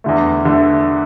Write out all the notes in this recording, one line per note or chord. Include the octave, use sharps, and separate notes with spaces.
E2 D3 A3
D3 A3